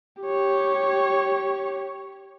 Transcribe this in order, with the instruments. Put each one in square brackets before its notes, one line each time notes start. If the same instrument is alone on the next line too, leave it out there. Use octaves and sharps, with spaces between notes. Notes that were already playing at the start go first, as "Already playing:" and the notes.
[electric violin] G4 C#5